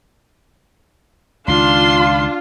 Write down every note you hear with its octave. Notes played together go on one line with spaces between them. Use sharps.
C#2 D#3 D4 F4 C6